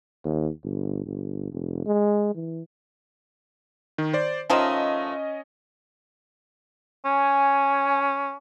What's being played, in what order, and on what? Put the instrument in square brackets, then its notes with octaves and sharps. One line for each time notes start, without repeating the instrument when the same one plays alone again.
[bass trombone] D#2
G1
G1
F1
G#3
E3
[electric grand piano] D#3
C5 D5
[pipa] D#3 F3 A3 [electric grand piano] C#4 D#5
[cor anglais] C#4 [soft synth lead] G#5